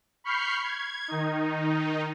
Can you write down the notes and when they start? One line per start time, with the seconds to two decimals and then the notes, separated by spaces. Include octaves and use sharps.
0.24 B5 C#6 F6 G6 C7
0.63 G#6
1.08 D#3 D#4